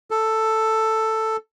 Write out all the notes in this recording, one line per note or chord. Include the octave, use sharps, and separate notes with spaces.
A4